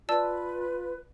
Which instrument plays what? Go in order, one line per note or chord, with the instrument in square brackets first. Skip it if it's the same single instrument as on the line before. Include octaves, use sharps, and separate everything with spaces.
[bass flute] F4 [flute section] B4 [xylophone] D5 A5 E6